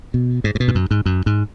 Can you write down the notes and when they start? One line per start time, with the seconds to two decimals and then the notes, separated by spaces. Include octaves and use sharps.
0.14 B2
0.44 G#2
0.55 G#2
0.60 B2
0.68 G#2
0.75 F#2
0.91 G#2
1.06 F#2
1.26 G#2